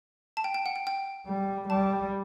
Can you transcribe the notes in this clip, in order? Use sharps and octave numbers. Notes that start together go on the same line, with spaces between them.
A5
G5
G5
F#5
G5
G5
G3
G3 A5